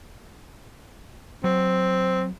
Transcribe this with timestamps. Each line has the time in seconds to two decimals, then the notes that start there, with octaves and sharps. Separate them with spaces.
1.44 F#3 C4